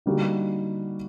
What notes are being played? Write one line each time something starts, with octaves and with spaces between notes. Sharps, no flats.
D3 G3 A#3 D#4 F#4